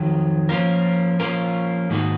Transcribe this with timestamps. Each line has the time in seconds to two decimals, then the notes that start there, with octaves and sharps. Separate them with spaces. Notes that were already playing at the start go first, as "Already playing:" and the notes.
Already playing: F2 D#3 F#3
0.49 F3 A#3 C#4 F4 A#4
1.20 F3 A#3 C#4 F4 A#4
1.90 G#2 D#3 A#3 D#4 F#4